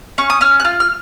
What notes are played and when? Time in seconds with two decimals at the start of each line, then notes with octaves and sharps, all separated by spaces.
0.18 C#4 C#6
0.30 D#6
0.41 C#4 F6
0.60 F#6
0.64 F4 F6
0.80 F6